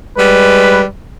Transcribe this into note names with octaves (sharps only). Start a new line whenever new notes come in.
G3 G#3 B4